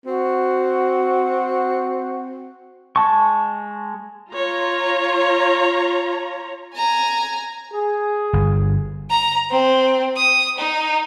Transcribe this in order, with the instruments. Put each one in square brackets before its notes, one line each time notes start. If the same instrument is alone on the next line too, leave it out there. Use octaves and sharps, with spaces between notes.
[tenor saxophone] C4 [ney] F#4
[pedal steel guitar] G#3 A5 C#6
[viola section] F4 C#5 A#5
[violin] G#5 A#5
[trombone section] G#4
[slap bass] G1
[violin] A#5
C4
D#6
D#4